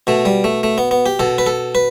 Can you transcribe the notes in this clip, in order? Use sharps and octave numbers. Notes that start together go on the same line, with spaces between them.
B2 A3
G3
A3
A3
B3
B3
G4
B2 A4
B4
A4
B4